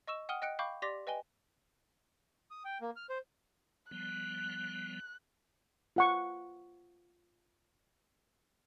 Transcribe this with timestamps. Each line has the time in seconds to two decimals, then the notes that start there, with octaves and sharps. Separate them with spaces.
0.07 D#5 C#6 E6 E7
0.29 F#5 G5 D#6 F6 D#7 G7
0.42 D#5 G5 F#6 C#7 D7
0.59 F5 G5 B5 C#6 D6 G6
0.82 G4 D5 C6 D6 A#6 B6
1.07 B4 D#5 G5 G#5 G7
2.51 D#6
2.65 G5
2.81 A#3
2.96 F6
3.10 C5
3.91 F3 G3 B3 F#6
5.96 F4 F#5 C#6